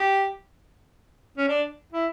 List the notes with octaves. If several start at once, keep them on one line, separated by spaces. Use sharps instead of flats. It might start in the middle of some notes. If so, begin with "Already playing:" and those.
Already playing: G4
C#4
D4
E4